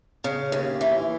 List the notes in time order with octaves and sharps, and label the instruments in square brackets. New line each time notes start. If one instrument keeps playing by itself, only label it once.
[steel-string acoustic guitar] C#3
D#2
E3